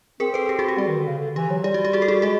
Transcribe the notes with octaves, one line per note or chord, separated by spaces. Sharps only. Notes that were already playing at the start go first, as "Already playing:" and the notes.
C4 G#4 A#4
A4 B4
G4 A4
F#4 G#4
G4
G3 F#4
D#3
D3
C#3
D3
E3 G4
F#3
G3 G4
F#4
G4
F#4 G#4
A4
F#4 G#4
G#3 F#4 G#4